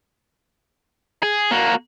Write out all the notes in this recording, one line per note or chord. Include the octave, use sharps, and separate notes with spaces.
G#4
A#3 F#4